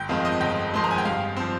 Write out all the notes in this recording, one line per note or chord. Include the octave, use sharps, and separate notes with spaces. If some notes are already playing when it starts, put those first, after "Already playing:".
Already playing: G1 G5
F2 D#3 G#3 C4 F5
D#5
G1 G5
F2 D#3 G#3 C4 C6
A#5
G#5
G5
G2 F5
F3 C4